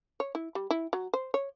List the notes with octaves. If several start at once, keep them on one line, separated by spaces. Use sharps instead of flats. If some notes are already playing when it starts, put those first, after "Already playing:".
C#5
E4
G3
E4
F#3
C5
C#5